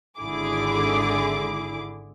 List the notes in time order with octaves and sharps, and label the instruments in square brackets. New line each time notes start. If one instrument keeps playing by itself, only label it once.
[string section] G#1 D3 E4 G#4 D6